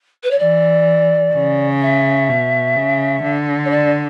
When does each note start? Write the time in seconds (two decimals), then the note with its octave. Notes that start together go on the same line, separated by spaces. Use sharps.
0.23 B4
0.31 C#5
0.39 E3 D5
1.34 C#3
1.81 E5
2.29 B2
2.76 C#3
3.23 D3
3.65 C#5
3.70 D5